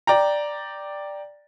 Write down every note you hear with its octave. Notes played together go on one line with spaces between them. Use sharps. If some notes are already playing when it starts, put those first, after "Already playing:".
D5 G5 A#5